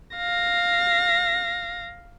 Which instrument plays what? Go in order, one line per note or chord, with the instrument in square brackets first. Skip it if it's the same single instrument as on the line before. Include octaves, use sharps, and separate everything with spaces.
[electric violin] F5 A#6